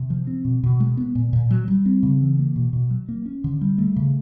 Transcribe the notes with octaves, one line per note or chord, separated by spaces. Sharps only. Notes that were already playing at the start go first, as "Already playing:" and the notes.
Already playing: C3
F3
C4
B2
B2
G#3
B3
A#2
A#2
F#3
G3
C4
C#3
E3
A#3
B2
B2
F#3
A#3
C#4
D3
G3
A3
C#3